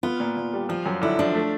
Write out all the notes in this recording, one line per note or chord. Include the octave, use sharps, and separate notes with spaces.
B3 F4
A#2
A#2
G3
F3 F4
F#2
D3 E4
F3 D4
A3